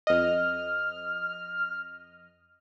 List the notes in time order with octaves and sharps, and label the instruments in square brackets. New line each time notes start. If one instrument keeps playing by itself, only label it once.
[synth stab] F2 D#5 [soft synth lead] F6